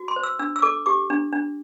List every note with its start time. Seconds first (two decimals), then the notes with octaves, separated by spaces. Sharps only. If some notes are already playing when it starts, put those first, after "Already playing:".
Already playing: F#4
0.08 C6
0.16 C5
0.23 E6
0.39 D4 E6
0.56 E6
0.62 A4 D6
0.86 G4 D6
1.10 D4
1.33 D4